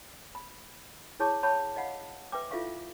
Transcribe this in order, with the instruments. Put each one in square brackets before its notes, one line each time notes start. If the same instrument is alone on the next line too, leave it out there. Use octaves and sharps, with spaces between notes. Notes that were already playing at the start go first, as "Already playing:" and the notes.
[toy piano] B5
E4 G#4 C#5 A5 C#6 D6
C#5 F#5 A5 B5 C#6
D#5 F5 F#5 B5
B4 E5 G5 D6
E4 F4 A4 E5 F5 C#6